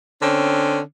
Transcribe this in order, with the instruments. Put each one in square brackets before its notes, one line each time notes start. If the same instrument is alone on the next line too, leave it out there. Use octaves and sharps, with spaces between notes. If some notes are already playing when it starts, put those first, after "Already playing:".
[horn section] D3 C4 C#4